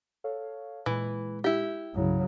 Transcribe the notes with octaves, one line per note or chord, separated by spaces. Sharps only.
A4 C#5 F5
A#2 E3 G#3
E4 G4
C2 G2 C#3 F#3 E4